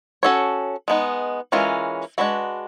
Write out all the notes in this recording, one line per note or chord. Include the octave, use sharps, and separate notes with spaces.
C#4 F#4 A4 C#5
G#3 B3 D#4
E3 G#3 C#4 F4 A#4
G#3 B3 D4 F#4 B4